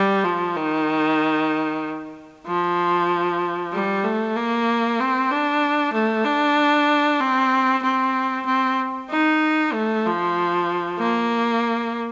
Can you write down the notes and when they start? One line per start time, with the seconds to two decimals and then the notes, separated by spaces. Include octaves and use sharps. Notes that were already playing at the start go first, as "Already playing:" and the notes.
Already playing: G3
0.24 F3
0.56 D#3
2.47 F3
3.72 G3
4.04 A3
4.36 A#3
5.00 C4
5.31 D4
5.93 A3
6.25 D4
7.20 C4
7.83 C4
8.46 C4
9.10 D#4
9.73 A3
10.05 F3
11.00 A#3